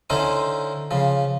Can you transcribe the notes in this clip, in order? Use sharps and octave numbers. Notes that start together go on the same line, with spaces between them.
D3 C#4 D#4 E4 C5
C#3 F3